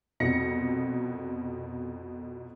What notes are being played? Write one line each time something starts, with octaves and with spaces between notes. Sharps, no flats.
C2 F2 B2 A#6 C#7